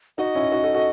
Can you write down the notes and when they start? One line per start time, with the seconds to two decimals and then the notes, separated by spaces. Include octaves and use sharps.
0.18 D#4 F#4 D#5
0.35 C#4 E4
0.52 D#4 F#4
0.63 F#4 A4
0.74 F#4 A4